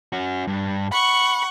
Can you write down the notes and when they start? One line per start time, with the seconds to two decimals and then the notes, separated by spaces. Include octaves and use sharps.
0.12 C#4 F#4
0.47 G2
0.92 F#5 B5 C#6